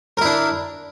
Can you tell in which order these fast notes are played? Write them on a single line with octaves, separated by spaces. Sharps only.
A#4 E4 D4